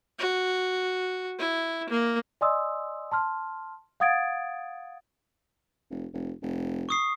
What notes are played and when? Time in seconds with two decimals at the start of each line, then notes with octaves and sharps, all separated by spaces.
0.19 F#4
1.39 E4
1.90 A#3
2.41 D5 D#5 G#5 C6 D#6 E6
3.12 A5 C6 F6
4.00 F5 F#5 D#6 G#6 A6 D7
5.91 F1
6.14 F1
6.42 F1
6.89 C#6 D#6 C7